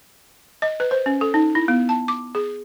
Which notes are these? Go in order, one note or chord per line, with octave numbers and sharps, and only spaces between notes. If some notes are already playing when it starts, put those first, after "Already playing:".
D#5
B4
C5
C#4
A4
D#4
E4
B3
A5
D6
G#4